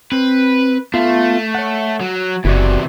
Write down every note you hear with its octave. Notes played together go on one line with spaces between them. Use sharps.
C4 B4
A3 B3 F4 F5
C#5 F#5
F#3
F#1 E2 C3 E4 F#4 D5